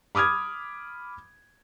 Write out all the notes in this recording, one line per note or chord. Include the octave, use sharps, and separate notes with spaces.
B5 D6 D#6 F6 G#6